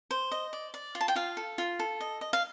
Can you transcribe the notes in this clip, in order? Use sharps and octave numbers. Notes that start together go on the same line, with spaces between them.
C5
D#5
D5
D5
F4
A5
G5
F4 F5
A4
F4
A4
D#5
D#5
F5